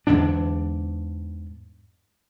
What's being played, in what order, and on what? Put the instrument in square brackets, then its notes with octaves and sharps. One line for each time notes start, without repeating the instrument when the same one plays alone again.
[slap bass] E2 G#2 D3 D4